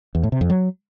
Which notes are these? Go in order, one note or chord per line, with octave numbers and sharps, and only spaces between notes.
E2
A2
C3
F2
F#3